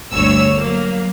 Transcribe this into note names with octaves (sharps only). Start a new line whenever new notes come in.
G1 D2 C#5 E6
F#3 A#3